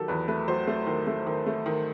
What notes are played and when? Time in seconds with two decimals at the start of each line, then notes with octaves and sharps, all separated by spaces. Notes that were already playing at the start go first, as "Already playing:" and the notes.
Already playing: D#3 F#3 G4 A4
0.08 E2 B4
0.28 A3 B4
0.48 F#3 C5
0.67 A3
0.87 D#3
1.07 A3
1.26 D#3
1.46 A3
1.66 D#3